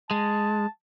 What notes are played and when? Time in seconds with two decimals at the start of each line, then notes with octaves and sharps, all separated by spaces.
0.11 G#3 A5